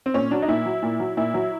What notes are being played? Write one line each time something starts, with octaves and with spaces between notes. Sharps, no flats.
C4
A#2 C#4
F#3 D4
D#4
A#2 E4
F#3
A#2
F#3
A#2 E4
F#3